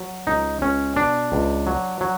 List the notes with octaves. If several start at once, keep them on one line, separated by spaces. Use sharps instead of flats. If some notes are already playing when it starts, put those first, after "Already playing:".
Already playing: F#3
C#2 D#4
C#2 C#4
B2 D4
C#2
F#3
F#3